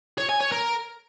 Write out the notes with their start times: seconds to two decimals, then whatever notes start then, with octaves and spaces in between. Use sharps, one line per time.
0.18 C#5
0.29 G#5
0.41 C#5
0.52 A#4